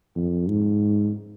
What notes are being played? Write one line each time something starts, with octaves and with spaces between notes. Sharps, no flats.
F2
G#2